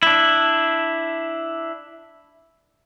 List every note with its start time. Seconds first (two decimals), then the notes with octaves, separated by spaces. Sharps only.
0.03 D4 E4